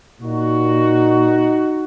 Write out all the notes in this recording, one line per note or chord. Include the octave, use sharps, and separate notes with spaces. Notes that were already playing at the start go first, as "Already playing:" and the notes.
A#2 D#4 F#4